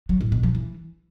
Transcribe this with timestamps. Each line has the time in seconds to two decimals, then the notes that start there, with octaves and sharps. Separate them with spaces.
0.09 F#3
0.21 A2
0.32 B2
0.43 F3
0.55 E3